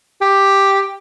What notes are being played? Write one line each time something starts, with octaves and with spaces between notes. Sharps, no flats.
G4